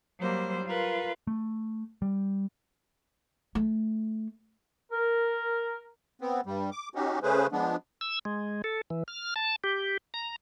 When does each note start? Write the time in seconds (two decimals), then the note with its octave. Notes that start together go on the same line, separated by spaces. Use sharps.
0.20 F#3 G3 A#3 C5
0.66 F4 A#4 B4
1.27 A3
2.02 G3
3.55 A3
4.91 A#4
6.21 B3 C4
6.46 G2 G3
6.72 D6
6.95 C#4 D#4 F#4 G4
7.23 C#3 A3 C#4 G#4 B4 C5
7.52 F3 G#3 B3 D4
8.01 E6
8.25 G#3
8.64 A4
8.90 E3
9.08 F6
9.36 A5
9.64 G4
10.14 A#5